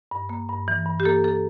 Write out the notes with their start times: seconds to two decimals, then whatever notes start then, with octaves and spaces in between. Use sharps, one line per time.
0.11 G2
0.29 A#3
0.49 G2
0.68 E3
0.86 G2
1.00 G4
1.05 A#3 A4
1.24 A#3 A4